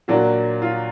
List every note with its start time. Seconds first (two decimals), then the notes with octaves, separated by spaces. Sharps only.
0.08 A#2 F#3 A#3 D4 F#4
0.62 F4